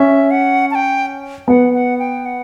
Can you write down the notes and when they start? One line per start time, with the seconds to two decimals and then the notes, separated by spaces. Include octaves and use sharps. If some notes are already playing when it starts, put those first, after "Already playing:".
Already playing: C#4 E5
0.31 F#5
0.71 A5
0.75 G5
1.48 B3 F#5
1.74 F#5
1.99 G5
2.26 F#5